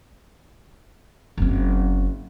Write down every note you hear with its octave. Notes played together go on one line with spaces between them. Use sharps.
F#1 C4